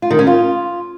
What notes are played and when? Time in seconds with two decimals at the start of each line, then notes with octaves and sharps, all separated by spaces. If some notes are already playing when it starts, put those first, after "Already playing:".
0.02 F4
0.11 D#3
0.19 C#4
0.27 F4